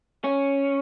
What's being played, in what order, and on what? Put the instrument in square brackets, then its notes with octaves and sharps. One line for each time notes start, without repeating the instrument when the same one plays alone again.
[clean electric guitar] C#4